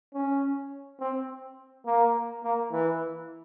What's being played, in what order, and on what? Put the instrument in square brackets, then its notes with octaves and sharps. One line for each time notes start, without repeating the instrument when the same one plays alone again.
[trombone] C#4
C4
A#3
A#3
E3